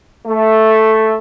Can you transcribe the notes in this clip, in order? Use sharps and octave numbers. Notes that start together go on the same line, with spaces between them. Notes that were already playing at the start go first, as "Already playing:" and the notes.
A3